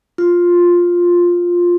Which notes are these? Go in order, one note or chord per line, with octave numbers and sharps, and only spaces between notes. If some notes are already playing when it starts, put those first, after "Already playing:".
F4